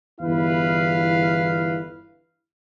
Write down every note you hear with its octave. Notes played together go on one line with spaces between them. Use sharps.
G1 E2 E4 B4 F5